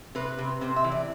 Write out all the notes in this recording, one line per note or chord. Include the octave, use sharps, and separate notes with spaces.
C3 B4
C3
C3 C5
E5
E3
D5